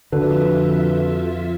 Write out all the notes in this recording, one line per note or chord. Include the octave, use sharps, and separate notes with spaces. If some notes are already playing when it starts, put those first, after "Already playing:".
F2 D3 F4 F#4 A4 B4 E5